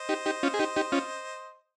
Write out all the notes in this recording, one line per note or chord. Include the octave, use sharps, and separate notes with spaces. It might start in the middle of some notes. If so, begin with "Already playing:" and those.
Already playing: C5 D#5
D#4 G4
D#4 G4
C#4 F4
G#4
D#4 G4
D#4 G4
C#4 F4